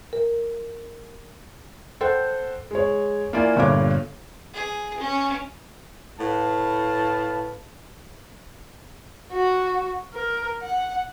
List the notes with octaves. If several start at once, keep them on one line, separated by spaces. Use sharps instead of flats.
A#4
A4 C5 F#5 G5
G#3 C#5
A#3 E4 F4 D5 G#5
G1 G2 A#2 D3 C#5 D6
G#4
C#4
A2 B4 F5 A5
F#4
A#4
F#5